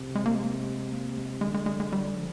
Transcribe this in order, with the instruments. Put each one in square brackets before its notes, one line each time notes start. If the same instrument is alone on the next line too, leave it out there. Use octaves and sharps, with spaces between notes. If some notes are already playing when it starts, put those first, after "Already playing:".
Already playing: [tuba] C3
[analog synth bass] G#3
A#3
G#3
A#3
G#3
A#3
G#3
[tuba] D3 [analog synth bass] G#3
[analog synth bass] G#3
G#3
G#3
G3
F3